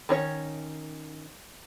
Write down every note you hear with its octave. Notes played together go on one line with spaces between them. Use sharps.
D#3 C#4 C#5